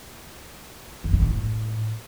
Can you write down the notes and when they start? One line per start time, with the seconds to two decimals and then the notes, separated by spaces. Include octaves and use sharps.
1.04 F2
1.13 B2
1.22 A2